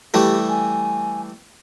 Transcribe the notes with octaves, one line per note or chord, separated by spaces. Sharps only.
E3 G3 A3 G4
G#5